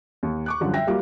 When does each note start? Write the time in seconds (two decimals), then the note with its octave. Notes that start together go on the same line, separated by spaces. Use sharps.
0.23 D#2
0.46 C#6 D6 F#6
0.60 F#2 D3 F3 G3
0.74 E5 G5 A#6
0.87 F#3 G3 A#3 F4 G4 D6